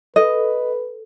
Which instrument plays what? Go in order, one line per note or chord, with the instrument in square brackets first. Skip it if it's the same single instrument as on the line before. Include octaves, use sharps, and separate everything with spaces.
[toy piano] A4 [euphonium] B4 [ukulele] D#5